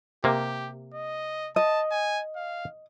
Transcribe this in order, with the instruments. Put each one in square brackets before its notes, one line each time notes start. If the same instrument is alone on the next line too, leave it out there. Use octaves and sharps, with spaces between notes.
[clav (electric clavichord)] C3 A#3 [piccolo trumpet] G4
[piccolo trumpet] D#5
[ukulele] D#5 [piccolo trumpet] A5
[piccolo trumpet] G#5
F5